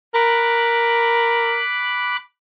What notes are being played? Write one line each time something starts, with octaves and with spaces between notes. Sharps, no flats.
A#4 B5 D6 F#6